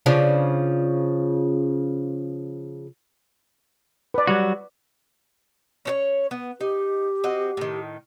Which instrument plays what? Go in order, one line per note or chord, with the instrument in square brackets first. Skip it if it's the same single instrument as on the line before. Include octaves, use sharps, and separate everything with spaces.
[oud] C#3 F3 D4
[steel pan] B4 D5
[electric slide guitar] F#3 G3 F#4
[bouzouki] C#4 D4 C#5
B3
[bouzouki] D#4 [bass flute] G4
[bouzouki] C4 F#4 D#5
A2 D#3